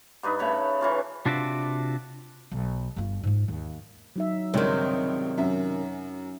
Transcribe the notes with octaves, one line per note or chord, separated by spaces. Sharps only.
G2 D#4 B4
C#3 A3 C#5 B5
E3 C#4 F4
C3 D4 F4 F#4 D5 E5
B1
G1 F4
G#2 F4
D#2
F#3 D#4 E5
C#2 G2 C3 D#3 C#5
F#2 C#4 E5